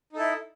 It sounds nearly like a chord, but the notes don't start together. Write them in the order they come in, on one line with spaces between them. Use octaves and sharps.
D#4 A4 E4